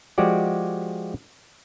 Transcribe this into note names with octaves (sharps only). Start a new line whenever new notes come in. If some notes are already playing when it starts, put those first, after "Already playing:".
F3 G#3 F#4 G4 D5